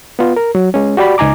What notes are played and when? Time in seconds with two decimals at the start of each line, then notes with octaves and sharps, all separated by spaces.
0.19 B3 F4
0.37 A#4
0.55 F#3
0.74 G#3 C#4
0.97 F#4 G4 D5 B5
1.18 C#2 D#4 G#5 A#5 D6